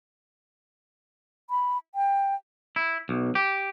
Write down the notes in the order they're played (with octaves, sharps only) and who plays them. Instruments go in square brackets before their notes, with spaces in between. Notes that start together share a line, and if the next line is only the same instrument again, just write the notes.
[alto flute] B5
G5
[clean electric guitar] E4
B1
G4